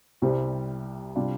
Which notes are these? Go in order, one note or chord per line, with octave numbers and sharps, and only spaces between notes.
C2 C3 G3 C4
C3 G3 D4 F4